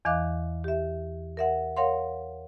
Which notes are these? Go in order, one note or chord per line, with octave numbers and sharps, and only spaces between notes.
E2 E3 D#5 F5 D6 F#6
G4 E5
A#4 E5 F#5
A#4 C#5 F5 F#5 C6